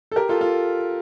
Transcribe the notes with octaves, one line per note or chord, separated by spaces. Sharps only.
A4
G4 A#4
F4 A4
F4